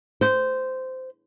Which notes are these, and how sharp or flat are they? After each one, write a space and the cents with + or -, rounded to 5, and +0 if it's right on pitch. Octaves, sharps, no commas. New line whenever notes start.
C5 -15